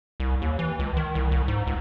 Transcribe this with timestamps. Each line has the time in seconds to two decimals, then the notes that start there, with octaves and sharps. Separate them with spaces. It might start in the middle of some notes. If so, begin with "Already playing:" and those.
0.20 C2
0.42 D#2
0.59 E3
0.79 C#2
0.97 D#3
1.15 C2
1.32 C2
1.48 G#2
1.67 C#2